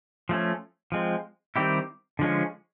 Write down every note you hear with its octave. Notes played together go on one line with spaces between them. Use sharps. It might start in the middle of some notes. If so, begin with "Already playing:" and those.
F3 A3 C#4
F3 G#3 C4
D#3 G3 C4 E4 G4
D3 F3 G#3 C#4